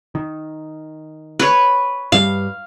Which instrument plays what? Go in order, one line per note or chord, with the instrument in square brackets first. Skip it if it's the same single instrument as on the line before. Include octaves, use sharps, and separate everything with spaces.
[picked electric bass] D#3
[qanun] B4 C#5
[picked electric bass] G2 G3 [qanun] F5